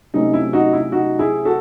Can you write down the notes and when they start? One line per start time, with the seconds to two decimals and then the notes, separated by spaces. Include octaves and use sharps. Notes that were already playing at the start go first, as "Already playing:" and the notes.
0.14 C3 F#3 A3 C#4 D#4
0.34 E4
0.53 D#4 F#4
0.73 E4
0.92 D#4 F#4
1.19 E4 G#4
1.45 F#4 A4